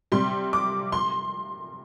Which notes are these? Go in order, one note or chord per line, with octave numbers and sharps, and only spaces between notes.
C3 G3 C6
D6
C6